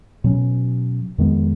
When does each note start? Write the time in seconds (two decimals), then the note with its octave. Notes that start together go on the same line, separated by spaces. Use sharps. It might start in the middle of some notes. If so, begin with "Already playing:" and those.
0.24 B2 F#3 C#4
1.18 F2 D#3 G#3 B3